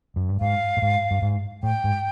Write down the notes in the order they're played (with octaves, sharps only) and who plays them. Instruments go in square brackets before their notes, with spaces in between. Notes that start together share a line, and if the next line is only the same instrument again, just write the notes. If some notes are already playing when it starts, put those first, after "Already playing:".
[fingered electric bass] F#2
G2
[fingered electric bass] G#2 [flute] F5
[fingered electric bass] A2
G#2
G2
G#2
[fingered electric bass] A2 [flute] G5
[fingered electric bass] G#2